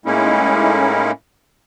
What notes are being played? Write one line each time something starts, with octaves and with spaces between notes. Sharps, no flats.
A2 G#3 A#3 C#4 D#4 E4